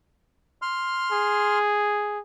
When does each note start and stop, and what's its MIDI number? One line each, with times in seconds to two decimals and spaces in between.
0.62 1.59 84
0.62 1.59 89
1.12 2.19 68